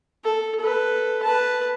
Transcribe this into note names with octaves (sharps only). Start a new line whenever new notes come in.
A4
A4 B4
B4 A5